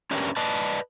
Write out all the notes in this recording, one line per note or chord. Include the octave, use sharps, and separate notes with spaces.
C#4 D4 G4 A#4 B4
B4 D5 D#5 A5